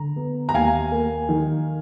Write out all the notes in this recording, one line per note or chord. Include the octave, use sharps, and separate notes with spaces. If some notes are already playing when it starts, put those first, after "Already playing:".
Already playing: D3 A#5
B3
A#5
D#2 F5 G#5
A#3
D#3